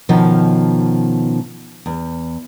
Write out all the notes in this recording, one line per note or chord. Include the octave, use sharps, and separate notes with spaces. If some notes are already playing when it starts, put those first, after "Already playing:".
B2 D#3 F3 C#4
E2